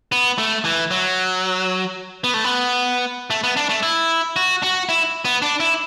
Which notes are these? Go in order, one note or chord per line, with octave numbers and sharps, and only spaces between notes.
B3
A3
E3
F#3
B3
A3
B3
A3
B3
D4
A3
E4
F#4
F#4
E4
B3
D4
E4